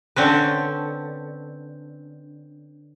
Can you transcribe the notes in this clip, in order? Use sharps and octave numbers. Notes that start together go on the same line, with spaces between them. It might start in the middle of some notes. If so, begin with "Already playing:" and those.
D3 C4 C#4 B4